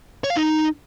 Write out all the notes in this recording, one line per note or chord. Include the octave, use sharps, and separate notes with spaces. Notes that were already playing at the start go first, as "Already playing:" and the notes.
C#5
F5
D#4